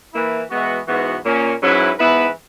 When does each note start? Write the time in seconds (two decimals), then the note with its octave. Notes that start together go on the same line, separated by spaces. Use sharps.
0.13 E3 A#3 E4
0.50 E3 G#3 B3 F#4
0.87 G#2 E3 B3 F#4
1.24 A#2 A#3 C#4
1.61 G#2 F#3 C#4 E4 B4
1.99 G#2 E3 B3 E4 B4